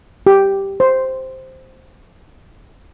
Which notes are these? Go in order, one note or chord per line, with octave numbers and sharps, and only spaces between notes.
G4
C5